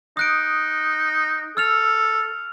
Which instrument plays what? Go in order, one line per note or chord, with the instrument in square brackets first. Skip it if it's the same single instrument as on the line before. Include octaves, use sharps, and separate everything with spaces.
[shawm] D#4 [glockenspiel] D#6 F#6 D7
[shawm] A4 [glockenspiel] E6 F6 F7